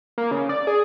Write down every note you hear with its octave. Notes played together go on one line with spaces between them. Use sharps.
A#3
C#3
D5
G#4